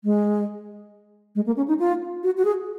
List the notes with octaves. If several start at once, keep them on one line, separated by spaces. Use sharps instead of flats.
G#3
G#3
A#3
C#4
D#4
F4
F#4
F#4
G#4